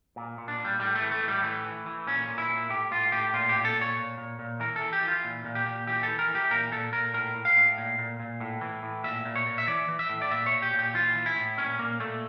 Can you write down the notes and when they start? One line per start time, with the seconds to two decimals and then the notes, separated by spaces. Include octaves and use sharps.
0.16 A#2
0.38 A#2
0.48 D4
0.59 A#2
0.65 G3
0.80 A2 G3
0.95 A3
1.01 E3
1.12 A3
1.23 A2
1.28 G3
1.43 E3 A3
1.65 E3
1.86 E3
2.07 A#2 C#4
2.29 A#2
2.38 E4
2.49 A#2
2.70 A2 G4
2.91 A2 F4
3.12 A2 G4
3.34 A#2 F4
3.49 G4
3.55 A#2
3.65 A4
3.75 A#2
3.81 C#5
3.96 A#2
4.18 A#2
4.39 A#2
4.60 E3 A#4
4.76 A4
4.82 E3
4.93 G4
5.02 E3
5.08 F4
5.24 A#2
5.45 A#2
5.55 G4
5.66 A#2
5.87 E3 G4
6.03 E3 A4
6.19 A#4
6.29 E3
6.35 G4
6.50 A#2 A#4
6.72 A#2 A4
6.92 A#2 A#4
7.14 A2 A#4
7.35 A2
7.45 F5
7.57 A2
7.78 A#2
7.99 A#2
8.20 A#2
8.40 A2
8.61 E3
8.83 A2
9.04 A#2 E5
9.25 A#2
9.36 C#5
9.46 A#2
9.58 E5
9.68 E3 D5
9.88 E3
9.99 E5
10.09 A2
10.22 D5
10.31 A#2 E5
10.46 C#5
10.52 A#2
10.62 G4
10.74 A#2
10.79 G4
10.94 E3 F4
11.15 E3
11.26 E4
11.36 A2
11.57 A#2 C#4
11.79 A#2 A#3
12.00 A#2 A3